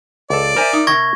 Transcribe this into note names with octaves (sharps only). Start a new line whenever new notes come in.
C#2 A4 D5
A#4 C5 E5 G#5
D#4
C3 D#3 C#6 G#6 A#6